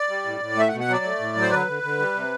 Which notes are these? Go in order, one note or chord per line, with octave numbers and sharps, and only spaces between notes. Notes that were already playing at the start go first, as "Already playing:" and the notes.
Already playing: D5
G3
A2
A2
A3 E5
F#5
B2
F#5
F#3 D5
A3
A2
F#3
C5
D3 B4
D3
D3
G3
C3